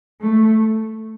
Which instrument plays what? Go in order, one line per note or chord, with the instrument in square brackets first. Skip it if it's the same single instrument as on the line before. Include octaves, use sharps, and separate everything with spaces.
[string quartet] A3